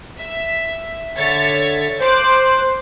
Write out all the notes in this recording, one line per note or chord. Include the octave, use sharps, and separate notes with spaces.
E5
D3 C#5 E5 A6
C5 D6 F#6